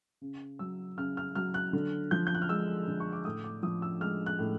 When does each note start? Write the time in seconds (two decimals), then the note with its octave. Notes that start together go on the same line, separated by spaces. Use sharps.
0.21 C#3
0.59 F#3 E6
0.97 C#3 F6
1.17 F6
1.35 F#3 F6
1.54 F#6
1.73 D3
2.11 F3 G6
2.27 G6
2.35 F#6
2.42 F6
2.49 G#3 E6
2.88 D3
3.00 C#6
3.13 D6
3.25 A2 D#6
3.44 D6
3.63 F3 D#6
3.82 E6
4.01 G#3 F6
4.26 F#6
4.39 A2